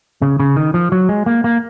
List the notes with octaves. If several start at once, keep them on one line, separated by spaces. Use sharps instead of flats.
C#3
C#3
D#3
F3
F#3
G#3
A#3
A#3